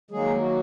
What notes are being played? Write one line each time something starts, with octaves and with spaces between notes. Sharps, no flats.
D#3 F#3 G#3 A#3 G#4
F#4